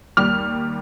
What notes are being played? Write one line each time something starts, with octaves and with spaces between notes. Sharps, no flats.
D#2 G3 F6